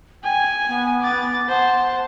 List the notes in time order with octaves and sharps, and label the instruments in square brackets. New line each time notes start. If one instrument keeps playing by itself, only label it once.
[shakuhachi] G5 [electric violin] G#5
[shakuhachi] B3
[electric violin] D6 A6
[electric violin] C5 A5 [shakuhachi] F#5